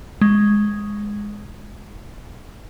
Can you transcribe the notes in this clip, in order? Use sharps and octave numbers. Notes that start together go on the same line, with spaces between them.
G#3